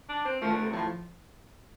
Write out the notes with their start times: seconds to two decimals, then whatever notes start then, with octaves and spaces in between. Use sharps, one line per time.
0.09 D4
0.25 C4
0.42 F3 A3
0.52 D3
0.63 C3
0.72 A2 F3